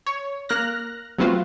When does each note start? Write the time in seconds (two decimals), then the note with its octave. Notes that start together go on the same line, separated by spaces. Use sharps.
0.07 C#5
0.49 A#3 F6 F#6 A#6
1.18 F#3 A3 B3 C4 F4 F#4